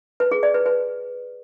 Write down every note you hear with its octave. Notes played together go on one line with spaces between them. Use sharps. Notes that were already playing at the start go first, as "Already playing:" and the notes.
B4
G#4
D5
B4
B4